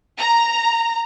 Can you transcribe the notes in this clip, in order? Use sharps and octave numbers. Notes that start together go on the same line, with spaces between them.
A#5